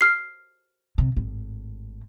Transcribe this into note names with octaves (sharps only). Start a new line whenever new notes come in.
F6 C7
C3
G#1 A2